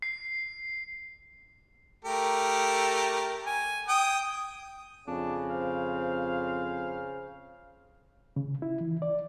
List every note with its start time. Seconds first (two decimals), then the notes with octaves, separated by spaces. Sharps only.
0.02 C7
2.05 A3 G4 A#4
3.46 G#5
3.88 G5 D#6
5.07 F2 C#3 D4
5.50 C5 F5
8.36 C#3
8.62 E4
8.81 E3
9.02 D5